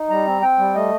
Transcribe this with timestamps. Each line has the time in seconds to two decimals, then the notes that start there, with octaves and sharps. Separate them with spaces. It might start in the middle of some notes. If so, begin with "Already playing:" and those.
Already playing: D#4
0.09 G3 A#5
0.26 C4
0.42 C4 G5
0.59 G3
0.75 A3 D#5